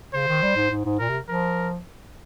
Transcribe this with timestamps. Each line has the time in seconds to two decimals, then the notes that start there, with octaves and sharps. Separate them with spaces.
0.14 C#3 C5
0.27 D#3
0.42 G3
0.56 G#2
0.71 G#2
0.85 G#2
0.99 A#2 A#4
1.09 C3
1.28 F3 A#4